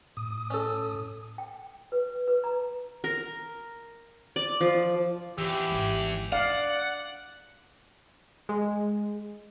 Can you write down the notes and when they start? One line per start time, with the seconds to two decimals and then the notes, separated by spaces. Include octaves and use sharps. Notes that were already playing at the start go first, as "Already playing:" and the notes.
0.17 A2 D#6
0.50 C#4 A4
1.38 G5
1.92 B4
2.28 B4
2.44 A#5
3.04 A#4
4.36 D5
4.61 F3
5.38 E2 A2 G4 E6
5.70 G#1 G#3
6.32 D4 D5 F5 F#5
8.49 G#3